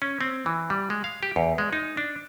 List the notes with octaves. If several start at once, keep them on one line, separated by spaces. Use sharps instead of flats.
C#4
C4
E3
G3
G#3
F5
G4
E2
G#3
D#4
D4